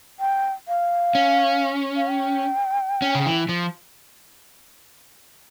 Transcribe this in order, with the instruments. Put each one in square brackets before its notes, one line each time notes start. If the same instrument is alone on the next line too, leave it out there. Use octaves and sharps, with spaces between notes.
[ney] G5
F5
[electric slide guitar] C#4
[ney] F5
G5
[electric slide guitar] C#4
C#3
E3
F3